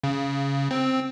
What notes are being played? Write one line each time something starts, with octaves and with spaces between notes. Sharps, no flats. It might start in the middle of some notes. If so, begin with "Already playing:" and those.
C#3
C4